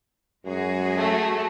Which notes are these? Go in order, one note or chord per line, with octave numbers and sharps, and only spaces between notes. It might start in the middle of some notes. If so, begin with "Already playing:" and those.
F#2 G#3 F#4 G#4
A3